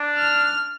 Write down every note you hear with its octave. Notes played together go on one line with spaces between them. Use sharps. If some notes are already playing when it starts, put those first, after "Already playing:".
Already playing: D4
F6